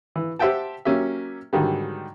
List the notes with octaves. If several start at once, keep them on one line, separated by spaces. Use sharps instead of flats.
E3
G4 C5 E5 F#5 G5 A5
F#3 A#3 C#4 G4 E5
G#2 D3 D#3 F#3 G3